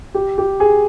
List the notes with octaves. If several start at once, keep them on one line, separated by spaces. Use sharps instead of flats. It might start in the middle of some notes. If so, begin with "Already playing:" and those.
G4
G4
G#4